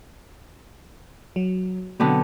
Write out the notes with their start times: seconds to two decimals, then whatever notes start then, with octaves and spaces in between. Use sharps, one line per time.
1.36 F#3
2.00 B2 D3 F#3 B3 C4